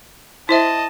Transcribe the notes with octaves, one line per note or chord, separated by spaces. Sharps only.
E4 C5 D#5 E5 A5